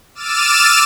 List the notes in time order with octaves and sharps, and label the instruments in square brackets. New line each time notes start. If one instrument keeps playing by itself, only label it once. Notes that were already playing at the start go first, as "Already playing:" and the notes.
[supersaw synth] D6 E6 F6 A6 D#7 E7